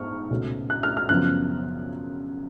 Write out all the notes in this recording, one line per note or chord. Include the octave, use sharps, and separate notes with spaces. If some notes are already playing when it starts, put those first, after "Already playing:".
Already playing: G#2 B3 C#6 F6
C#2 B2 A3 C#4
F#6
F6
F6
F#2 C#3 F3 B3 F#6